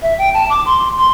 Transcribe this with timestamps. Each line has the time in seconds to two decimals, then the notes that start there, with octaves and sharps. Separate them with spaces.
0.02 E5
0.18 G5
0.34 A5
0.50 D6
0.66 C6
0.98 C6